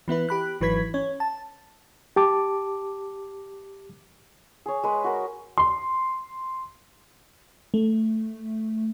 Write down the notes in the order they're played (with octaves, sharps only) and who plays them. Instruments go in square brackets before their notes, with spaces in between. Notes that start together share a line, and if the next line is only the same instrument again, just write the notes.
[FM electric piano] E3 B3 E4 B4
G4 B5 F#6
G#1 E3 F#3 B4 G#6 B6
C#4 C#5
A5
[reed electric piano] G4 A5 D6
[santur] G#4 C#5
G#3 B4 B5
F#4 A#4
[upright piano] C6
[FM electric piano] A3